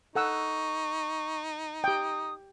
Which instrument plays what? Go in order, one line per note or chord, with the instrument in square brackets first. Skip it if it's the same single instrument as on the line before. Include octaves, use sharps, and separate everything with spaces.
[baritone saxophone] D#4 [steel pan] A4 F#5 E6 [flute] C#6
[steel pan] G4 G5 [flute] D#6